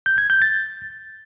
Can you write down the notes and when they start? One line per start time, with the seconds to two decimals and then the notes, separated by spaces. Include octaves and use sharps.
0.06 G6
0.18 G#6
0.30 G6
0.42 A6